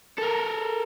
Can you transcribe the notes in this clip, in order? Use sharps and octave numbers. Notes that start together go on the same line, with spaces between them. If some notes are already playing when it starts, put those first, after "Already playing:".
A4 A#4